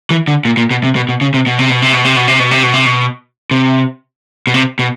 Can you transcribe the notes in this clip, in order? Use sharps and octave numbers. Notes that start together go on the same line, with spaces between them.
E3
D3
A#2
A#2
B2
C3
B2
B2
C#3
C3
B2
C3
B2
C3
B2
C3
B2
C3
B2
C3
B2
C3
B2
C3
B2
C3
B2